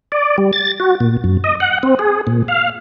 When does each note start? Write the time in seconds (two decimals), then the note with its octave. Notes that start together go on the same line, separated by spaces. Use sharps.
0.12 D5
0.38 G3
0.53 A6
0.80 F#4
1.00 A#2
1.24 F#2
1.44 D#5
1.60 F#5
1.83 C4
1.99 G#4
2.27 A#2
2.48 F5